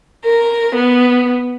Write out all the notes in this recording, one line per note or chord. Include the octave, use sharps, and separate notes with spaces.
A#4
B3